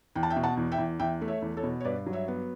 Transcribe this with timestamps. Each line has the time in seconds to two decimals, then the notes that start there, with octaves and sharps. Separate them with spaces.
0.15 E2 G5
0.23 A5
0.30 E5 G5
0.36 B2
0.43 F#5 A5
0.57 E2
0.72 E5 G5
0.78 E2
0.99 E2 E5 G5
1.21 A3
1.28 C#5 E5
1.42 E2
1.57 A4 C#5
1.63 B2
1.80 C#5
1.84 G2 B4 D5
2.06 F#3
2.13 C#5 E5
2.28 B3